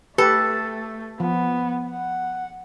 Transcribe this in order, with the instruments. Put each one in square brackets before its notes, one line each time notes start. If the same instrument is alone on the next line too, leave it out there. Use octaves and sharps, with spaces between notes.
[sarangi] A3 [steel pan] G4 B4 [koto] A4
[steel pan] F3 [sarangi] B3
[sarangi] F#5